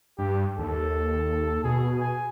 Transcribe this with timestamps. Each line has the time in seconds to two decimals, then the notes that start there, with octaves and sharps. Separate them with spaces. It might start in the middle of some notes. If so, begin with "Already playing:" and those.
0.19 G2 G4
0.59 D#2 A4
1.64 B2 G#4
2.00 G#5